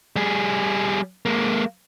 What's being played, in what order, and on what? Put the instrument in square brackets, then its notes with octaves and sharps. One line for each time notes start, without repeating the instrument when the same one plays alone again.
[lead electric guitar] G3 G#4
G#3 A#3